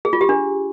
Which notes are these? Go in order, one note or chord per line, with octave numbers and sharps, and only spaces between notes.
G#4
F4
G4
D4